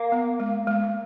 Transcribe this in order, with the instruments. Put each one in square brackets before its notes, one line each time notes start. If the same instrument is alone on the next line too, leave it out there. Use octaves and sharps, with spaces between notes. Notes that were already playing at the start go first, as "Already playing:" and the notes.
Already playing: [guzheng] A#3
[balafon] B3
G#3
G#3